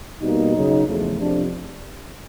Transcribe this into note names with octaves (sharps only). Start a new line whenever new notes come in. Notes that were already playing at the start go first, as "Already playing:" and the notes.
B2 G3 A#3 D#4
F#2 C#3 F#3
E2 C#3 F3 A3
F2 C3 F3 D4